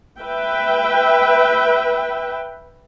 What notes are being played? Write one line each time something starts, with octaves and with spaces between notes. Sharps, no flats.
B4 E5 G5